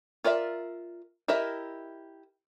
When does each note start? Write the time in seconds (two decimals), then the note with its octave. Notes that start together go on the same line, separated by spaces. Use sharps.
0.24 F4 A#4 D5 E5
1.28 E4 G4 A#4 D#5 E5